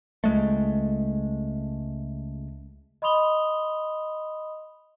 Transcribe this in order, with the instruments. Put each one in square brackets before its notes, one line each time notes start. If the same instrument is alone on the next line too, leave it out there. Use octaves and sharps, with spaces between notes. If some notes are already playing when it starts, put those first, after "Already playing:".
[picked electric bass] C#2 G#3 A3
[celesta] D#5 B5 C6 D#6 F7 G7